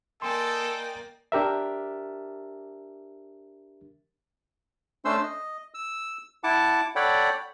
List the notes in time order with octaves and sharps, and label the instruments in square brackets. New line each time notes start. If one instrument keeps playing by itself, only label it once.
[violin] A#3 D5 [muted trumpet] A4 [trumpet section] D#5 G5 [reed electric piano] G#5 C6
[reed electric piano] D4 G4 A#4 E5
[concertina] A3 C#4 D4 C5 C6 E6
D#5
E6
E4 F#5 A5 D6
A4 C#5 D5 F#5 G5 B5